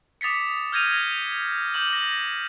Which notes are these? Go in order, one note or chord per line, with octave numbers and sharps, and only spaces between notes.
D6 D#6 A6 B6 C#7
F6 G6 G#6 A#6 D#7 F7
D6 G6 F#7
A#6